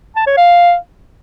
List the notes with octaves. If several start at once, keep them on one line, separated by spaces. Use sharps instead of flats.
A5
C#5
F5